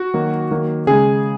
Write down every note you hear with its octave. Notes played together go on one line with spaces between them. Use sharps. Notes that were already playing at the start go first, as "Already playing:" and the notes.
Already playing: F#4
D#3 F#3 A#3
D#3 F#3 A#3
C#3 G#3 G#4